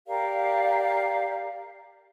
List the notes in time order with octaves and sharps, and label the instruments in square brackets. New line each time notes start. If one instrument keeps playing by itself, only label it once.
[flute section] G4 A#4 D5 F5